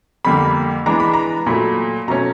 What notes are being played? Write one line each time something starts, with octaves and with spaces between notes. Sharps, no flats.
F2 D3 G3 A#3 B5
E3 G#3 B3 D4 A#5
B5
A#5
A#2 F#3 A3 B5
B2 F#3 A3 C#4 A#5